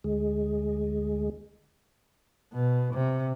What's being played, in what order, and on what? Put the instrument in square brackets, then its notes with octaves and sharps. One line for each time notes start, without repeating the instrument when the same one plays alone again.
[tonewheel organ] D2 G#3
[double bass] B2
C3